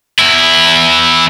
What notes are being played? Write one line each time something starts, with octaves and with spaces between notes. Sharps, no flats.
E2 E4